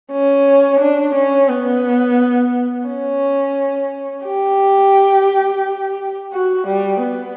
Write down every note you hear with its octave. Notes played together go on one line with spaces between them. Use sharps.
C#4
D4
C#4
B3
C#4
G4
F#4
G3
B3